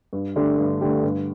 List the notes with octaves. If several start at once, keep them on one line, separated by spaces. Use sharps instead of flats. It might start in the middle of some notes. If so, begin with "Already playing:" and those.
G2
D3 A3 D4 G4
G2
D3 A3 D4 G4
G2